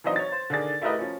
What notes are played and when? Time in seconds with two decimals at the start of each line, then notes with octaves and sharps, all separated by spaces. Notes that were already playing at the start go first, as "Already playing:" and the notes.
0.04 E3 F#3 C4 D4 D#4 D#5
0.16 C#5 A6
0.32 C5
0.50 D3 D#3 G#4 D5 A6
0.81 A3 E4 G4 A#4 B4 D#5
0.99 F3 C#4